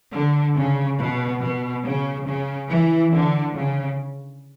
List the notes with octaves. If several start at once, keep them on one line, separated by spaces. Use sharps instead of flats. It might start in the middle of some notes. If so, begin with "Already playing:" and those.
D3
C#3
B2
B2
C#3
C#3
E3
D3
C#3